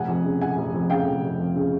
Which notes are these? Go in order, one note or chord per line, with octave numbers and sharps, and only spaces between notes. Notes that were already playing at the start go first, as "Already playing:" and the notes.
Already playing: F1 F#5 G#5
F2
C#3
F1 F#5 G#5
F1
F2
C#3 F5 G5
F1
F1
F2
C#3